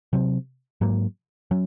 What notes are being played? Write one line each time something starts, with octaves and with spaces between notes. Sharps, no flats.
C3 F#3 C4
G#2 F#3 A#3
F#3 C#4